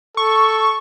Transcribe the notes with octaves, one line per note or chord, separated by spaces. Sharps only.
A4 C#6